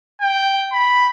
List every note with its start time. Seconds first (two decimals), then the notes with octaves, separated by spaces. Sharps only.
0.21 G5
0.72 B5